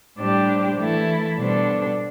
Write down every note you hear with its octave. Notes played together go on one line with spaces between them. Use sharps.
A2 G3 D4 G4 C5
E3 A3 E4 A4
B2 G3 D4 A4 C5